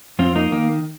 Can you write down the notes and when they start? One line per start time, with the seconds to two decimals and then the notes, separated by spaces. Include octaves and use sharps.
0.19 F2 C4 F4
0.35 A#3 D#4
0.52 D#3 A#3